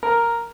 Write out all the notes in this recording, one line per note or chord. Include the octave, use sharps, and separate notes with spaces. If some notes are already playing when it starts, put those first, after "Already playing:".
A#4